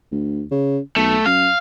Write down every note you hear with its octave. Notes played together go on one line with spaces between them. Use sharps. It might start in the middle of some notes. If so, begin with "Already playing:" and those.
D2
C#3
B1 A3
F#2 F5